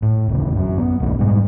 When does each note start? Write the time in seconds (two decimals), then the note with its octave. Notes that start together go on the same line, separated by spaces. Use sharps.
0.02 A2
0.28 D#1 A1 D#2 C#3
0.56 F#2 F#3
0.77 B3
1.00 D1 B1 B2 A3
1.19 G#2 G3 G#3